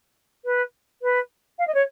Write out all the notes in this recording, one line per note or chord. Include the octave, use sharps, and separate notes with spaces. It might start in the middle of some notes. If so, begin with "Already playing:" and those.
B4
B4
F5
D#5
C#5